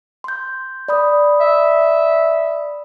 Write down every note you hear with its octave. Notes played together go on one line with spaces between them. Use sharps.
C6 G6
D5 B5 D#6
E5